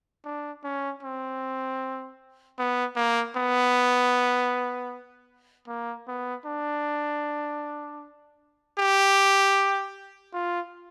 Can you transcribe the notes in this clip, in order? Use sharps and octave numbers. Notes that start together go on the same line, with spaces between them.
D4
C#4
C4
B3
A#3
B3
A#3
B3
D4
G4
F4